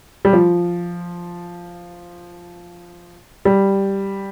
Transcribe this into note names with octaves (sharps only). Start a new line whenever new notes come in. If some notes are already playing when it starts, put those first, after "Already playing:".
G3
F3
G3